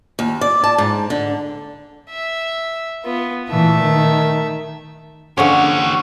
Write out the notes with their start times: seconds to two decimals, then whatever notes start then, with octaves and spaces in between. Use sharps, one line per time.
0.19 D#2
0.41 D5
0.64 A5
0.78 G#2
1.10 D3
2.10 E5
3.04 B3 F4
3.49 A#2 E3 A3 E5
3.83 D#3
5.37 D3 F3 C#4 G4 C#5 F#5